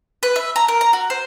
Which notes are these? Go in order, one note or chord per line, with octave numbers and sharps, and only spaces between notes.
B4
E5
A#5
A#4
A#5
F#4
C5